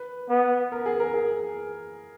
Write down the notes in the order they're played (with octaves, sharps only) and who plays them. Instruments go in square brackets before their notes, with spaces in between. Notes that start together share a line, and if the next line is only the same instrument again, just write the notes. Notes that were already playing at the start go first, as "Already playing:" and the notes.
Already playing: [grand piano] B4
[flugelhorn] B3
[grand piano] A#4
G#4
A#4
G#4